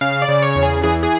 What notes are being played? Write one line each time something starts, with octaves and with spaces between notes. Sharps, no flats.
C#3 F5
D5
C#3
C#5
E2
G#4
E3 G#4
G#4